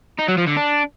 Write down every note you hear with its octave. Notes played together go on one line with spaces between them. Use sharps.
D#4
F#3
F3
D3
D4